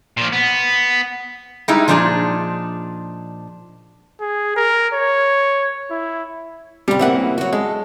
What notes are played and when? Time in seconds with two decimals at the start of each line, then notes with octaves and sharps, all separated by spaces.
0.17 A#2 F3
0.33 B3
1.68 G3 G#3 D#4 E4
1.88 A#2 F3 D4 D#4 G#4
4.20 G#4
4.56 A#4
4.93 C#5
5.90 E4
6.88 D2 C3 G3
6.99 C#3 E3 A#3 C4 E5 F#5
7.38 F#3 F#4
7.53 G#3 A4